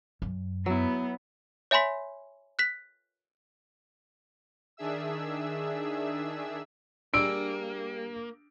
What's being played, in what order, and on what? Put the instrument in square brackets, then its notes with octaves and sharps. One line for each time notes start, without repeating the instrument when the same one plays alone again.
[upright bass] F#2
[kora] F#3 E4 [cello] B3
[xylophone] C#5 E5 G#5 B5 C6 B6
F#6 B6
[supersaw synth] D#3 D4 G#4 E5 E6
[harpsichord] G3 G#4 D5 [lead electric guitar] A#3 [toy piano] D4 E6 [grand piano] D7